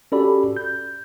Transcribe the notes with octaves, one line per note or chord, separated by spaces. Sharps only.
C#4 F#4 G4 A4 D5 B5
G6